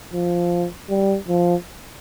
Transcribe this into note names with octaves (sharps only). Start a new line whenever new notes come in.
F3
G3
F3